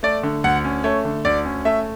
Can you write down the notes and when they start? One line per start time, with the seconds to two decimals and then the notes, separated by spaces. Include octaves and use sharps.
0.03 A3 D5
0.23 D3
0.44 D2 F#5
0.65 C#4
0.84 A3 C#5
1.05 D3
1.25 D2 D5
1.45 C#4
1.65 A3 E5